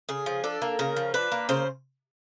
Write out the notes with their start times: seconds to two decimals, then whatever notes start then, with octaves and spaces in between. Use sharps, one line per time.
0.09 C#3 G#4
0.26 F3
0.44 D4 A4
0.62 A#3
0.79 C#3 A#4
0.96 F3
1.14 D4 B4
1.32 A#3
1.49 C#3 C5